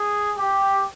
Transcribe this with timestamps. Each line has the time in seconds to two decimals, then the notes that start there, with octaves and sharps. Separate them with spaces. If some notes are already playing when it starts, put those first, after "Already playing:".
Already playing: G#4
0.37 G4